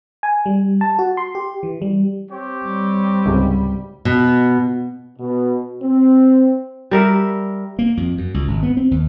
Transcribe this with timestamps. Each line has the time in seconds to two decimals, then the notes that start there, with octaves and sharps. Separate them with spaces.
0.23 G#5
0.46 G3
0.81 A5
0.99 F#4
1.17 C6
1.35 G4
1.63 E3
1.82 G3
2.30 C4 G4 C#5
2.66 G3
3.26 C#2 G#2 C3
4.05 B2
5.19 B2
5.82 C4
6.91 G3 A#4 E5
7.79 A#3
7.97 F2
8.18 F#2
8.34 C#2
8.48 G#1
8.63 B3
8.77 C4
8.91 D#2